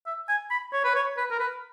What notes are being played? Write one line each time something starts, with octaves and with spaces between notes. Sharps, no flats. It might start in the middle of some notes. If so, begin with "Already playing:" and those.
E5
G#5
B5
C#5
B4
C#5
B4
A#4
B4